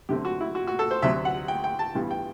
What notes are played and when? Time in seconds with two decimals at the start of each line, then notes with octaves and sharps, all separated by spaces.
0.09 F#2 D3 A3 C4 G4
0.25 F#4
0.41 E4
0.55 F#4
0.67 F#4
0.79 A4
0.91 C5
1.02 D2 C3 F#3 E5
1.25 F#5
1.48 G5
1.64 G5
1.79 A5
1.95 A1 G2 E3 G3 B3
2.11 G5